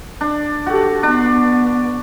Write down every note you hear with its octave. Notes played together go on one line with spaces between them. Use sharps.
D4
F#4 G4 A4
B3 D4